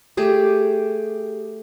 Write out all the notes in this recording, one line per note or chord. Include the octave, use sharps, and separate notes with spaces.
A3 G4 G#4